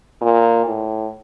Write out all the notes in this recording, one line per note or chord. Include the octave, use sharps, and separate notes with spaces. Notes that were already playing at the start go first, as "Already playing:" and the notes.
A#2
A2